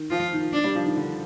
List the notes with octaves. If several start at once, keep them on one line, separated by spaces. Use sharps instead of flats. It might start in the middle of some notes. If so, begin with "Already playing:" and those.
Already playing: D#3
F3 F4
D#3
D4
G3
F3
D#3
D3